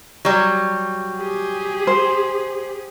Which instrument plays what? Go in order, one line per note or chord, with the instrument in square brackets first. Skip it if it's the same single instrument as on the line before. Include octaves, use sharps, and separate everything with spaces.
[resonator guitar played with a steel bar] F#3 G3
[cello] G4 G#4
[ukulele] C5